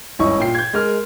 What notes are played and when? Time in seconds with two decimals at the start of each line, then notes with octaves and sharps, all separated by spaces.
0.19 G#1 G2 C#4 E4 D#5 C#6
0.39 A#2 G5 C7
0.55 G6 G#6
0.73 G#3 A#4 F6